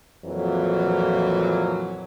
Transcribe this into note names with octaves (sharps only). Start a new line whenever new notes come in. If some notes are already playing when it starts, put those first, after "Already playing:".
F2 A#2 E3 F#3